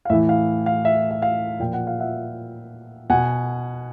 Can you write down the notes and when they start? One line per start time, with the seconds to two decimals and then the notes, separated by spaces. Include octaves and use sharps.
0.05 F5
0.10 A2 E3 E5
0.29 F5
0.66 F5
0.85 E5
1.11 E5
1.22 F5
1.60 A#2 F3 G5
1.73 F#5
1.87 F5
2.00 E5 F#5
3.10 B2 F#5 G#5